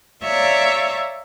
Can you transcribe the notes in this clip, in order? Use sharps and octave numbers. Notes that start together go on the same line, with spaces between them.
C#5 D5 E5 F5 A#5